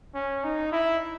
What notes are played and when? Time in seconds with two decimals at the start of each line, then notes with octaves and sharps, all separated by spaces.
0.15 C#4
0.44 D#4
0.72 E4